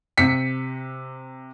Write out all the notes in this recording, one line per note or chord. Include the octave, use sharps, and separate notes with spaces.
C3 B6 C#7